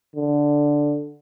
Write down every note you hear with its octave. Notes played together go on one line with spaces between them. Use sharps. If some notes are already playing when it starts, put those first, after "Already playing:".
D3